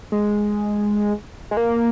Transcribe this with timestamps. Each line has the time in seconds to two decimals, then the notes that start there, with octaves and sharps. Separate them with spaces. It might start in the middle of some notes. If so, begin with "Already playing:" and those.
0.12 G#3
1.51 G#3
1.57 A#3